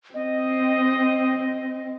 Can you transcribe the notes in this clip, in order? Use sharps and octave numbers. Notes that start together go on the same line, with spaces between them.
C4 D#5